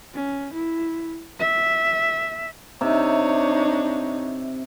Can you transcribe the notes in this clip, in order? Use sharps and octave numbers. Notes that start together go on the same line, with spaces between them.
C#4
E4
E5
C3 D4 D#4 C#5 E5